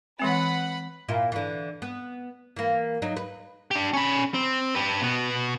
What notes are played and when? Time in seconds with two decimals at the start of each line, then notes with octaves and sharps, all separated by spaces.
0.19 E3 G#3 C4 B4 F#5 B5
1.09 A#2 E4 F4
1.32 D3 E3
1.82 B3
2.56 E3 A#3
3.02 F#3 D#4
3.16 B4
3.71 D4 G4
3.93 C#4 B5
4.34 C4
4.75 G4 B4
5.02 B2 B3